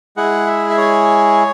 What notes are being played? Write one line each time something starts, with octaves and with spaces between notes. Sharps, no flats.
G#3 E4 G#4 F#5
E5
E5
C#5